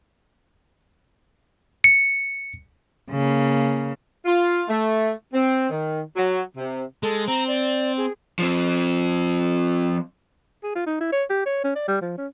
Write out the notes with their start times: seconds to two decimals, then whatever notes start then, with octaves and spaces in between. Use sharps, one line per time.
1.84 C#7
3.10 C#3 A#3
4.25 F4
4.69 A3
5.34 C4
5.70 D#3
6.16 F#3
6.57 C3
7.03 G#3 A4
7.28 C4 A#5
7.48 D5
7.97 G#4
8.39 F3 C4
10.63 G#4
10.75 F4
10.87 D#4
11.01 E4
11.13 C#5
11.30 G4
11.46 C#5
11.64 C#4
11.76 D5
11.88 G3
12.01 F3
12.18 C#4